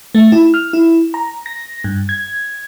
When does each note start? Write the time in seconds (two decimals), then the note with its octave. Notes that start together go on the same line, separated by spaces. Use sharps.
0.15 A3
0.32 E4
0.54 F6
0.73 E4
1.14 A#5
1.46 A#6
1.84 G2
2.09 G#6